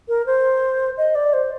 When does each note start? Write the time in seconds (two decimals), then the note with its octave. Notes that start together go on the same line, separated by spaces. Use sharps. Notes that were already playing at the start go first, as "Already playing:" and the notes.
0.09 A#4
0.26 C5
0.97 D#5
1.15 D5
1.33 C5